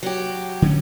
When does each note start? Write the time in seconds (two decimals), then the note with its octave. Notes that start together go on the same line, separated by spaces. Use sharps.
0.03 F#3 G4
0.62 D3 F#3 C#4